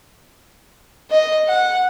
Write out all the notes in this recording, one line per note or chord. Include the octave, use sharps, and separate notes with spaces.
D#5
F#5